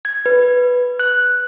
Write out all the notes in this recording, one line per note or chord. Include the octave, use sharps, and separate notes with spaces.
G#6
B4
F#6